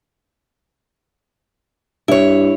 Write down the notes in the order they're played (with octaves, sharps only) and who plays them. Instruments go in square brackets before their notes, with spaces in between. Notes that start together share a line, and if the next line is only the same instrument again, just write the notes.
[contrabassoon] G2 [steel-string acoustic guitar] E4 C#5